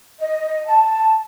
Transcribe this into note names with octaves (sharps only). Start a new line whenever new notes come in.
D#5
A5